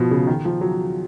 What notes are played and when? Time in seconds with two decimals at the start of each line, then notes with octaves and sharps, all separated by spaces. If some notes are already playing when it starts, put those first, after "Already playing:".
Already playing: B2 F3
0.11 C#3
0.27 D#3
0.45 F3
0.61 F#3